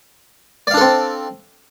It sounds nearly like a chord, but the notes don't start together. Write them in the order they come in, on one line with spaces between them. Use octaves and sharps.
D5 F5 D4 A4 C4